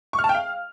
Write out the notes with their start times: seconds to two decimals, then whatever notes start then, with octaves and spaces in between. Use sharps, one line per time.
0.13 C#6
0.19 F6
0.24 A5
0.29 G5
0.35 F5